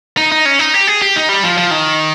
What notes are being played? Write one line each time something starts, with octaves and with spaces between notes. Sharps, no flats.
D#4
D#4
C#4
D#4
G4
G#4
G4
D#4
G3
F3
F3
D#3